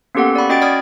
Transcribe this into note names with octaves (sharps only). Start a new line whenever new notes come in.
A#3 B3 C#4 G4 A4 F#5
D5 F#5 B5 C#6
C#4 F#4 D#5 G5 A6 D7
D5 B5 D#6 F6 G#6